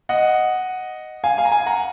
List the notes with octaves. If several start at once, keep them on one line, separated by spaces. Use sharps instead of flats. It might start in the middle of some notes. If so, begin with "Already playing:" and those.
D#5 F#5
F5 G#5
F5 G#5
A#5
F5 G#5
F#5 A#5